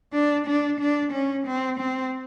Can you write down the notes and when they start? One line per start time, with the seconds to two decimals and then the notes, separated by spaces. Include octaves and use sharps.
0.13 D4
0.46 D4
0.80 D4
1.12 C#4
1.46 C4
1.79 C4